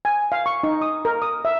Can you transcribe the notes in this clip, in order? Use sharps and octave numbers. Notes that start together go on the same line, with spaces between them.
G#5
F5
C#6
D#4
D#6
A#4
D#6
E5